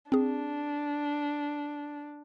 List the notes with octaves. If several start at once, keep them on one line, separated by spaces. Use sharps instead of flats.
C4 D4 G#4